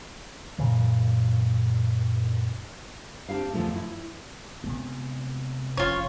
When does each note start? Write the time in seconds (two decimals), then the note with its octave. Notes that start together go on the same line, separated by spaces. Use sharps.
0.59 F#2 A#2 C#3 E3
3.29 C4 D4 E4 G4 F5
3.53 E2 G2 C#3 F3 G#3 A3
3.76 E4
4.64 C3 G#3 B3
5.77 F1 C#4 F4 C#5